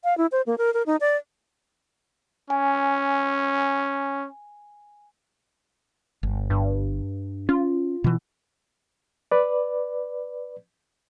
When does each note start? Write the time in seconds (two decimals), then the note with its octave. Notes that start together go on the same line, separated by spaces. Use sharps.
0.04 F5
0.18 E4
0.32 C5
0.47 A#3
0.58 A#4
0.74 A#4
0.86 D#4
1.01 D5
2.50 C#4 G#5
6.23 G1
6.50 G2
7.49 C#4 F4
8.04 B2 E3
9.32 B4 D5